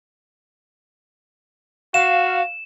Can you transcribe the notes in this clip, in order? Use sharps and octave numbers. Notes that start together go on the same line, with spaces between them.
F#4 F5 E7